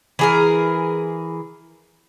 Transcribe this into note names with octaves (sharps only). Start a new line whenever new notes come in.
E3 G#4 A#4